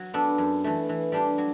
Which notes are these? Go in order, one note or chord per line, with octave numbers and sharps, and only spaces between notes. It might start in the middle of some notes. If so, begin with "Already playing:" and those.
Already playing: F#3
B3 D4 A4
F#2
E3 A3
E3
G3 D4 G4
F#3